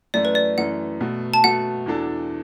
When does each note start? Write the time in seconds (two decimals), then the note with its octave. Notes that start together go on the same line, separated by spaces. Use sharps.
0.14 F#2 E3 A3 D5
0.25 B4
0.35 D5
0.58 F#2 E3 A3 F#5
1.00 B2 A3 F#4
1.34 A5
1.43 B2 A3 F#4 F#5
1.86 E2 E3 D4 F#4 A4